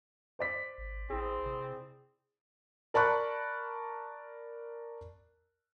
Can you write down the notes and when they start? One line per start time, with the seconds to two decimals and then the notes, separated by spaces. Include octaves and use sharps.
0.39 C5 D5 B6
0.78 G#1
1.10 A1 C4 E4 G#4
1.46 C3
2.94 A#4 D5 A5 B5 C#6 F#6